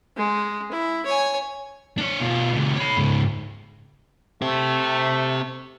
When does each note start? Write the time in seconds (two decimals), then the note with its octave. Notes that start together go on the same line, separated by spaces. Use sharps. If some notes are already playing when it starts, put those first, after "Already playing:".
0.17 G#3
0.71 E4
1.05 C#5 G#5
1.98 D4 C#5
2.20 B2 F4
2.53 C#2 A#2
2.76 C#5 B5
2.97 G#2 C#3
4.42 A3 C4 G4